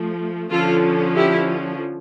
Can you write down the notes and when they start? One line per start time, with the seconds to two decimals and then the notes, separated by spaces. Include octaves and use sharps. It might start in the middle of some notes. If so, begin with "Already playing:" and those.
Already playing: F3 A3
0.51 D3 F3 C#4 F4 A4
1.15 E4 G4